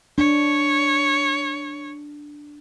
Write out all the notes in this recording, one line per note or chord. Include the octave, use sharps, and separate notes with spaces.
D4 C#5